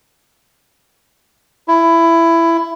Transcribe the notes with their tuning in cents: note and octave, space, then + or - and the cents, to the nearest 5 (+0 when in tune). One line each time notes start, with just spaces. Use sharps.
E4 +15